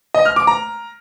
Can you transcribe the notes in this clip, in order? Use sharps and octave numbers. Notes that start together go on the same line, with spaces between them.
D#5
F6
D6
A#5